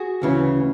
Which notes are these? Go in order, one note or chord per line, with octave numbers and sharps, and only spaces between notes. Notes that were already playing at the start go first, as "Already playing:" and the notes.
Already playing: F#4 G#4
D2 C#3 E3